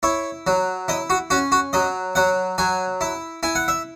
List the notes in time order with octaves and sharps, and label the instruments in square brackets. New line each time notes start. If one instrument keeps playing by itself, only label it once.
[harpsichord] E4 C#5
F#3
E4 D#5
F#4
C#4 F#4
F#4
F#3 D#5
F#3 F#5
F#3 G#5
E4
E4 G#5
F#5
E5